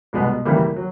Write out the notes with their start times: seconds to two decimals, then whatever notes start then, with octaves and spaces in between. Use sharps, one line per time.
0.13 C2 B2 G#3 B3
0.45 C#2 C#3 E3 G3 A#3
0.76 F#3